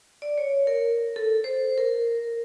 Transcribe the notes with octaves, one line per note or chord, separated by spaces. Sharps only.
D5
C#5
A#4
A4
C5
A#4